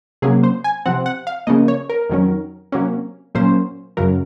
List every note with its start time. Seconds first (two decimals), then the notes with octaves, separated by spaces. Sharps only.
0.22 C3 F#3 A#3 C#4 G#4
0.43 C5
0.64 G#5
0.86 C3 F3 C4 F#5
1.06 F#5
1.27 F5
1.47 C#3 F3 A#3 D#5
1.68 C#5
1.89 A#4
2.10 F2 D#3 F#3 C#4
2.72 C3 F#3 A#3 C#4
3.35 A#2 F#3 A#3 C#4 C5
3.97 F#2 C#3 F#3 A#4